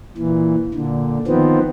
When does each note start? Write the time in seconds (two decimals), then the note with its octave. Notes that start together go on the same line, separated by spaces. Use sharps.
0.17 A#2 E3
0.74 A#2 D3
1.27 D#3 F3 B3 C4